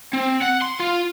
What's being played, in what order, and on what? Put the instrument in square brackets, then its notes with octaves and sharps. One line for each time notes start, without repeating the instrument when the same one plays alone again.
[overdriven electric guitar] C4
F#5
C6
F4